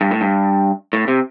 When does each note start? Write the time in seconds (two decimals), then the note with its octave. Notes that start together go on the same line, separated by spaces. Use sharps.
0.01 G2
0.11 A2
0.21 G2
0.93 A2
1.08 C3